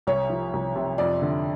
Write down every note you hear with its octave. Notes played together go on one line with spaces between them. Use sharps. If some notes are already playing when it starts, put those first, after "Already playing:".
C2 C#5
F3
C2
C3
F2 D5
D3